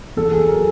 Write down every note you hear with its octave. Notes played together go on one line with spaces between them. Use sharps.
E2 A4
G#4
F#3
A#4